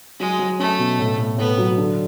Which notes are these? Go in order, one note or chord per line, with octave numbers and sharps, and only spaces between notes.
F#3 G#3
F#3
A3 C#4
B2
A2
A2
A2 B3
F#3
D3